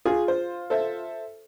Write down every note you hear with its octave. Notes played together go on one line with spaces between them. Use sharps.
F4 G#4
C5
A4 C5 E5